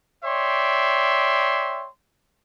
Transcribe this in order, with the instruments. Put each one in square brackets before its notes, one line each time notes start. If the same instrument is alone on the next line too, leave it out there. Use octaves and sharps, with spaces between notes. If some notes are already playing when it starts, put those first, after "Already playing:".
[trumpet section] C#5 D5 E5 G5 C6